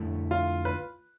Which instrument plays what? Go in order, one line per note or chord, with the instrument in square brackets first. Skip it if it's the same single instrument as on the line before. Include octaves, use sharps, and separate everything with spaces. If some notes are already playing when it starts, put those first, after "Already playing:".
Already playing: [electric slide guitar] F2 D3 A3 E4 A4
[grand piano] F4
B4